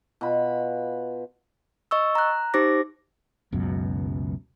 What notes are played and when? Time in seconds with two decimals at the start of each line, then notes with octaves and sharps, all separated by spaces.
0.21 B2 F4 B5
1.91 D#5 C#6 E6
2.15 A#5 F#6
2.54 D#4 G4 C5 D6 A#6
3.52 F#1 C#2 F#2 B2